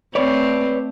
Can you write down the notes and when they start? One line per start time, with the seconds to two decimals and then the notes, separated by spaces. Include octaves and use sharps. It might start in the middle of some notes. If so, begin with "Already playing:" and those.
0.15 A3 C4 B4 C#5 D5